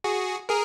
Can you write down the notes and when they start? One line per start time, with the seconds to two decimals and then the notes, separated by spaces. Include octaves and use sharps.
0.04 F#4 G#4
0.49 G#4 A#4